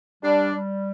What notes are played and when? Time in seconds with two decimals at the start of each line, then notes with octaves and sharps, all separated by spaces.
0.23 G3 D4
0.53 G3